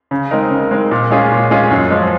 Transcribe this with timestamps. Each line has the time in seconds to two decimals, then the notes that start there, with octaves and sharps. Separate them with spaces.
0.11 C#3
0.31 G#3 C4 D#4 A#4
0.51 C#3
0.71 G#3 C4 D#4 A#4
0.91 A#2
1.11 G#3 C#4 F4 G#4
1.32 A#2
1.51 G#3 C#4 F4 G#4
1.70 F#2
1.91 F3 G#3